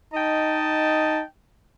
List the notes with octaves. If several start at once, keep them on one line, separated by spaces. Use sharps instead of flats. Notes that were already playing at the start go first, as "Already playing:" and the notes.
D#4 D#5 G5 A5